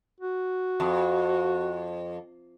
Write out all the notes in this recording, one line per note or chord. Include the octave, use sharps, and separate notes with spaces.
F#4
F2